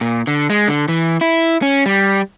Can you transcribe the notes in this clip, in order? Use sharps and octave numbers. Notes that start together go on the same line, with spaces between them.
A#2
D3
G#3
D3
E3
E4
C#4
G3